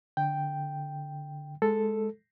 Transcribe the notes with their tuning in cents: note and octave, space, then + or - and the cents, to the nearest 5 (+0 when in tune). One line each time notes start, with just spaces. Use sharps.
D3 +0 G5 +0
G#3 +5 A4 +0